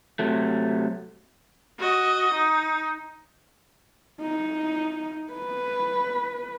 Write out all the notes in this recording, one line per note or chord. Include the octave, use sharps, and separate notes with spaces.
C3 F#3 A3
F#4 D#5
D#4
D#4
B4